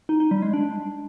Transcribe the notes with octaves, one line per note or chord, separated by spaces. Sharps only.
D#4
D#4
G3
G#3
D4